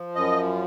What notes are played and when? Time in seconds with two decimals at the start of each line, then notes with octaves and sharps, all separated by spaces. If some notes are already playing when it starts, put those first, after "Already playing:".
Already playing: F3
0.16 F#2 D#5